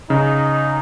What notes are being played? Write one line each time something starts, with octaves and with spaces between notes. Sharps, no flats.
C#3 D#4